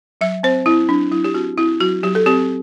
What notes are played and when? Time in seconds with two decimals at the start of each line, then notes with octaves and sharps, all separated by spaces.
0.21 F#3 E5
0.43 C4 C5
0.66 C4 E4
0.89 F#3 D4
1.12 F#3 E4
1.24 G4
1.34 C4 F#4
1.58 C4 E4
1.80 F#3 F#4
2.03 F#3 G4
2.15 A4
2.26 C4 G4